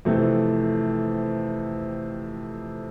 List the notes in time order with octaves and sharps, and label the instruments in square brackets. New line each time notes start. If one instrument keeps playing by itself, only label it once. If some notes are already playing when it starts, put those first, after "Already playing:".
[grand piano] F2 C3 E3 A3